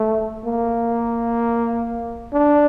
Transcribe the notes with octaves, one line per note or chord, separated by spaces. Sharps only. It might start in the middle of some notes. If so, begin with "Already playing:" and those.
Already playing: A3
A#3
D4